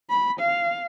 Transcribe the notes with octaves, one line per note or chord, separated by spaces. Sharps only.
B5
F5